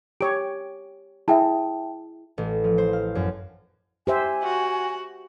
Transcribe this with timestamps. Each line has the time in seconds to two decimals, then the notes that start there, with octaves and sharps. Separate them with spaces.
0.21 G4 C#5 D7
1.28 E4 G#4 E5 G5 A5
2.38 A1
2.64 F3
2.78 C5
2.93 F5
3.15 F#2
4.07 G4 C5 E5 G#5
4.43 F#4